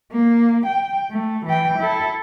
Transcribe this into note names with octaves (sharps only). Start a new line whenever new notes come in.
A#3
G5
A3
E3 G5
E4 A4